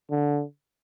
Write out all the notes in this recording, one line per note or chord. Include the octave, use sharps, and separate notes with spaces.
D3